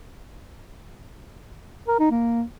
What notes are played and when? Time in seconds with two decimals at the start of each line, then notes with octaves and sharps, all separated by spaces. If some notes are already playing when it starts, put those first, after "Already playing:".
1.88 A#4
1.99 D#4
2.11 A#3